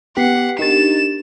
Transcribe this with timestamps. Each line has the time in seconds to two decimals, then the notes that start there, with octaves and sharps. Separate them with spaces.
0.17 B3 G4 F#5 B6 C7
0.59 D4 D#4 G4 A#4 A6 E7